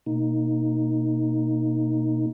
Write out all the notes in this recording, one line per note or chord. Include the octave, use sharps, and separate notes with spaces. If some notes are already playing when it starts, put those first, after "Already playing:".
B2 A#3 D#4